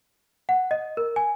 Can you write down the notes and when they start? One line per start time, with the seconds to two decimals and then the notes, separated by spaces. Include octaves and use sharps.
0.49 F#5
0.71 D#5
0.97 A#4
1.16 G#5